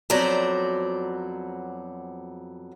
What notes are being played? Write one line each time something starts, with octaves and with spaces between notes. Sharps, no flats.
F2 F#3 B3 C5 D5 A#5